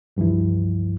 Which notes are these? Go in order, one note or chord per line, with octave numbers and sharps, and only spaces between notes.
C#2 G2 E3 F3 E4